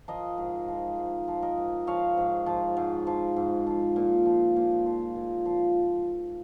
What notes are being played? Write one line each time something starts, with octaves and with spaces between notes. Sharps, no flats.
F3 A#4 D#5
G#2
F3
G#2
F3
A#4 D#5
G#2
F3 C#5 F5
G#2
F3
G#2
F3
G#2
F3
A#2
F3
A#2
F3
A#2
F3